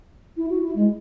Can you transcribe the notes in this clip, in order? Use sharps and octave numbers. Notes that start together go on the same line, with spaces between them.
E4
F#4
E4
G#3